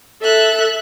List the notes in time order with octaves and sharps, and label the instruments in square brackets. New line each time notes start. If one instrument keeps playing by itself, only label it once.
[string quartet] A4 E5 F#6